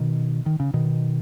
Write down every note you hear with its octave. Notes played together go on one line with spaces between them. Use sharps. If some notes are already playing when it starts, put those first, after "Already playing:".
Already playing: B2 D#3
D#3
C#3
B2 D#3